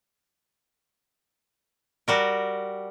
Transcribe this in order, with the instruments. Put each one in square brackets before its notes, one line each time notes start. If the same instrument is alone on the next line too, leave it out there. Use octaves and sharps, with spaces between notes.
[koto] G3 F#4 A#4